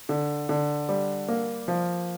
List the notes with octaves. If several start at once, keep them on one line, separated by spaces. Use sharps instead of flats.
D3
D3
G3
A#3
F3